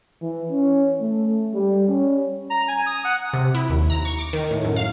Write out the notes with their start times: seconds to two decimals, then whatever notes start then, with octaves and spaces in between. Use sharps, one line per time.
0.22 E3
0.51 C#4
1.00 A3
1.54 G3
1.88 C#4
2.50 A#5
2.68 G#5
2.87 D#6
3.05 F#5
3.33 C3
3.55 E4
3.70 D#2
3.90 A#5
4.05 C#6
4.18 D6
4.33 D#3
4.51 A2
4.64 F#2
4.76 F5